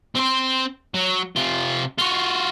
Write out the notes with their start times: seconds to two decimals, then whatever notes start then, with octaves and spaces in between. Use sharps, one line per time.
0.15 C4 C5
0.95 F#3
1.36 C3 F4
1.99 F4 F#4